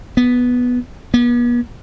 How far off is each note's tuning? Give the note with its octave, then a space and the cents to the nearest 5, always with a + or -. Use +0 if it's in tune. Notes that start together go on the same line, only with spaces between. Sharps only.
B3 -5
B3 -40